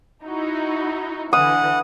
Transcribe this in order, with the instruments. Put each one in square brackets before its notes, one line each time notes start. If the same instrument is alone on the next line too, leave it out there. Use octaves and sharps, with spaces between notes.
[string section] D#4 E4 F#4
[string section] D3 E3 [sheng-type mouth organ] F#5 [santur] D#6